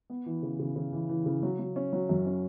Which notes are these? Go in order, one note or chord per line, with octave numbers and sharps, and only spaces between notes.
B3
E3
C#3
C#3
C#3
E3
E3
C#3
F#3
F#3
C#4
F#3
F#2
C#4